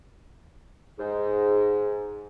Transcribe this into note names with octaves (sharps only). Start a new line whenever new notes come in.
G#2